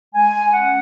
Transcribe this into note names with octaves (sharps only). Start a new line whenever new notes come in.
G#3 G#5
C#4 F#5